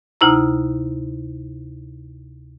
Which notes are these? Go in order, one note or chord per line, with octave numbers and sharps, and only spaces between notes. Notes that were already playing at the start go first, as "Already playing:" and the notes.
D2 C3 D#4 E4 A#5